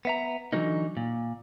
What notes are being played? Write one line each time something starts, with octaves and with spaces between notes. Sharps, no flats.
B3 E5 A#5
D3 E3 F#3 A#3 D#4
A#2